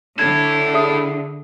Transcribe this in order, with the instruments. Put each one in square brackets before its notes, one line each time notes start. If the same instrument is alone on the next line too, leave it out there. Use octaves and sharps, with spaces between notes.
[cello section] D3 [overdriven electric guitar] E4 A4 [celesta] G#6
[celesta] G#4 E5 D#6